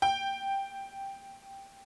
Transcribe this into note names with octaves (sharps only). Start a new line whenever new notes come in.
G5